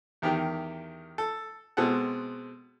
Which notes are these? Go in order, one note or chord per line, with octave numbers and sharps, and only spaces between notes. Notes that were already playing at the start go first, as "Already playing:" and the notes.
E2 D#3 G4 A#4
A4
B2 G#3 C4 A4 F#5